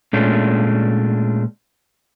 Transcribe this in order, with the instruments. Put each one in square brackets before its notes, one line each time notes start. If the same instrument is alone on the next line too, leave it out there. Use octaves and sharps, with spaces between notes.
[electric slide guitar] A#2 G#3 A3 C#4 D4 F4